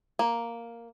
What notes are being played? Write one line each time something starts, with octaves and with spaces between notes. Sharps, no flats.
A#3